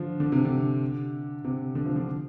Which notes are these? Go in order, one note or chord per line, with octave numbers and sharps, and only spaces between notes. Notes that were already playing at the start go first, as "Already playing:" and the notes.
Already playing: D3 F3
D3
C3
D3
C3
D3
F3
D3